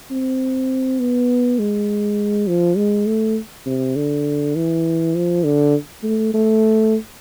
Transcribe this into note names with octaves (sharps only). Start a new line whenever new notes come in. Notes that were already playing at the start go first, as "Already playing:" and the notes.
C4
B3
G#3
F3
G#3
A3
C3
D3
E3
F3
D3
A3
A3